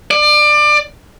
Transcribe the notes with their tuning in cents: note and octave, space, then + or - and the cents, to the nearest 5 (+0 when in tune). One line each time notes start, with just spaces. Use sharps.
D5 +25